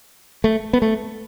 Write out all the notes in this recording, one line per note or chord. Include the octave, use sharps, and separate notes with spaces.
A3
B3
A3